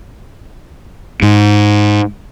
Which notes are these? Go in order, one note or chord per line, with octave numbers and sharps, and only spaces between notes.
G#2